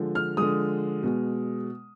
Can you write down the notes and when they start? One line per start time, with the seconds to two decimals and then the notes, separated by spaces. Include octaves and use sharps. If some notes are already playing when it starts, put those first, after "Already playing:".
Already playing: D3 F3 G#3
0.15 F6
0.37 D3 F3 G#3 D#6
1.03 B2 G#3